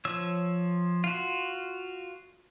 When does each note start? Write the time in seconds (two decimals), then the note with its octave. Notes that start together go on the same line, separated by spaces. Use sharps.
0.05 F3 C#5 E6
1.04 F4 F#4